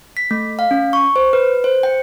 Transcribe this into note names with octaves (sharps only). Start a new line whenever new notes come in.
B6
A3
F5
C#4
C#6
C5
B4
C5
G5